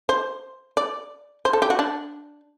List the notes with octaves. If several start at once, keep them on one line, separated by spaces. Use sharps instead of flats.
C5
D5
C5
A4
G4
F#4
D4